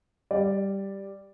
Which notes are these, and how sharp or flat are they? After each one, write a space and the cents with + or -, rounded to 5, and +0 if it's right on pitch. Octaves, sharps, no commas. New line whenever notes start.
G3 +0 D5 +0